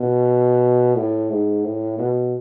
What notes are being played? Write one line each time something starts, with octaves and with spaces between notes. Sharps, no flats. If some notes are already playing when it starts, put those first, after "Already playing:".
Already playing: B2
A2
G#2
A2
B2